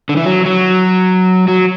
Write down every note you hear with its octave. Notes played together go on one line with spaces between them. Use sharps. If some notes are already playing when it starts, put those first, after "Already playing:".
D3
E3
F#3
F#3
F#3